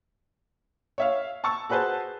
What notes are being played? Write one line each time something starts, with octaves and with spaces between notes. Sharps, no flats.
C#5 E5 F5
A5 C#6 E6
F#4 G#4 B4 C5 A5